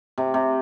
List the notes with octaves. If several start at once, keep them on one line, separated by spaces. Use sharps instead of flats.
C3
C3